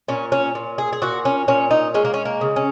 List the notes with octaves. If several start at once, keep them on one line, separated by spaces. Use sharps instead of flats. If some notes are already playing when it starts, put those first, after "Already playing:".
A#2 C#4
C#4
A#2
G#4
G#4
A#2 F#4
C#4
A#2 C#4
D#4
G#3 C#4
A#3
C#4
A#3
C#3
C#4